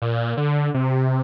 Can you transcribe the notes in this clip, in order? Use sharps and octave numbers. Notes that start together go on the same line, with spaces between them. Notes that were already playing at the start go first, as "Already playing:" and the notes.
A#2
D3
C3